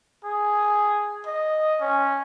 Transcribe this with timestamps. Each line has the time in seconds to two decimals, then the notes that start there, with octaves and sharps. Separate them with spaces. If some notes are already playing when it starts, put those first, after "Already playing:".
0.25 G#4
1.27 D#5
1.81 C#4